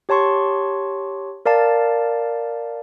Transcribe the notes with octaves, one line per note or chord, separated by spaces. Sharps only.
G4 C#5 A5 C6 C#6
A#4 D5 F5 A5